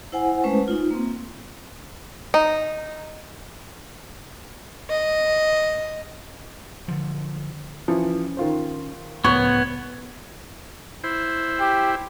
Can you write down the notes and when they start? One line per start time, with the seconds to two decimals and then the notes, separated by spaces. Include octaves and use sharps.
0.12 E4 C5 F#5 G#5
0.44 G#3 A3 C#4 B4 C5
0.68 D#4 F4
0.91 A#3 C4
2.34 D#4
4.88 D#5
6.88 D3 F3
7.88 E3 F3 C#4
8.37 D#3 F4 C5
9.24 C#2 A2 F3 B3 C#5
11.04 E4 C5
11.60 G4